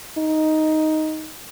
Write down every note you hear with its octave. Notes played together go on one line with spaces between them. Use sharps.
D#4